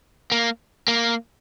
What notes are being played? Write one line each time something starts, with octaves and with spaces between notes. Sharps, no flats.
A#3
A#3